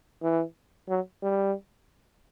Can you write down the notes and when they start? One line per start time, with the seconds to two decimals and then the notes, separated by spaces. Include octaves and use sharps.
0.22 E3
0.89 F#3
1.23 G3